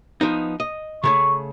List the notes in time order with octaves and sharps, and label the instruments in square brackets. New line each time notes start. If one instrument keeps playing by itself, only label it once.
[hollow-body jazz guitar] F3 B3 D#4
D#5
[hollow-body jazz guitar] C#3 A3 G#4 [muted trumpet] C#6